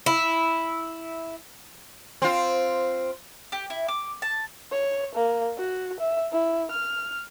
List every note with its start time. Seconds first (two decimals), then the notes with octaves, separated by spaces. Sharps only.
0.06 E4
2.22 C4 F4
3.52 G4
3.70 E4
3.88 D6
4.22 A5
4.72 C#5
5.15 A#3
5.57 F#4
6.00 E5
6.32 E4
6.71 F6